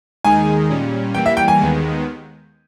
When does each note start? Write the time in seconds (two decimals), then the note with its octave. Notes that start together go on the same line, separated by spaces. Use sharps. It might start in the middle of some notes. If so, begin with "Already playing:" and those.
0.24 D#2 D#3 G#3 D#4 G#4 G#5
0.69 A#2 G3 C#4
1.14 E3 G3 A#3 G5
1.26 E5
1.37 G5
1.48 G#5
1.59 D#2 D#3 G#3 B3